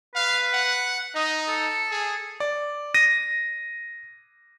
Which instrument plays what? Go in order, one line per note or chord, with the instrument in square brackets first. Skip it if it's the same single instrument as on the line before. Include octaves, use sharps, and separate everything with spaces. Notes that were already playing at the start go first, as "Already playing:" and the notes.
[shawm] B4 [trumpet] F5
[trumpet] F#5
[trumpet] D#4 [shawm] D#5
[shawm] A4
[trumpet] G#4
[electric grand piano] D5
A#6 D#7